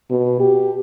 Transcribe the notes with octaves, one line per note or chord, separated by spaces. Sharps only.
B2
G4